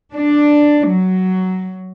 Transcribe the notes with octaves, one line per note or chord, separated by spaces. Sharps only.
D4
F#3